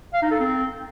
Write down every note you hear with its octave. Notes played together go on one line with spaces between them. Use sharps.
F5
D#4
A4
C4